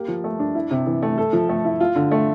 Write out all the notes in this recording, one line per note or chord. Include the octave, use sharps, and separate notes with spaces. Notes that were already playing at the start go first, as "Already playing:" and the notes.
Already playing: A#3 G4
F3
A3
D4
E4
C3
E3
A3
A4
F3
A3
E4
F4
D3
A3